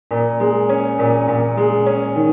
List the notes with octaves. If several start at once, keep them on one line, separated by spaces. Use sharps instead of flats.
A#2
G#3
C#4
A#2
A#2
G#3
C#4
D#3